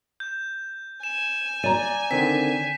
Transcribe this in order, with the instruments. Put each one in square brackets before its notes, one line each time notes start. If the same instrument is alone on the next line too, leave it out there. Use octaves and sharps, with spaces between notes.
[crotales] G6
[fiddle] G#5 [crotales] E7
[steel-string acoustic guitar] D5 A#5 [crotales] D#7
[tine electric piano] D3 D#3 C4 [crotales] B6